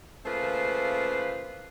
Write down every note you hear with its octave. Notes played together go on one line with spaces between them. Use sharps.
C#3 A3 A#3 F4 B4 C5